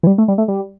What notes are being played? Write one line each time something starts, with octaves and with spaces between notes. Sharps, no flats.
E3
G3
A3
G3
A3
G3